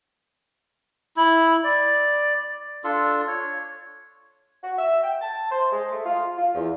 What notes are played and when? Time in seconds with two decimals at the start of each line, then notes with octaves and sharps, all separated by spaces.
1.17 E4
1.64 D5
2.84 D4 F4 A4
3.28 C#5
4.64 F#4
4.78 E5
5.03 G5
5.22 A5
5.51 C5
5.72 G#3
5.92 A3
6.06 F4
6.38 F4
6.55 E2